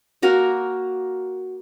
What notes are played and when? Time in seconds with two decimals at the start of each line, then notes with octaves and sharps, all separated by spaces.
0.22 A#3 F#4 A#4